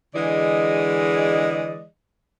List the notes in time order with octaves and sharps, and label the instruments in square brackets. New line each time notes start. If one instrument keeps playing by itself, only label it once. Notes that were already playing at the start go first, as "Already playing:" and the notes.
[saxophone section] D3 E3 G#3 G#4 D5 D#5